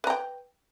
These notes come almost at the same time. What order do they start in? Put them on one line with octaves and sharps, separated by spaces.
B4 A#5 G5